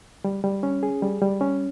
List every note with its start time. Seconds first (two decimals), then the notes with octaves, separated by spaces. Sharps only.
0.24 G3
0.44 G3
0.63 C#4
0.83 G#4
1.02 G3
1.22 G3
1.41 C#4